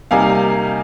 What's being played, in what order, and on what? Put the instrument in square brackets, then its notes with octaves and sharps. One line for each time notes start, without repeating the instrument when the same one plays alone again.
[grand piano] C3 G3 A#3 D#4 F5 G#5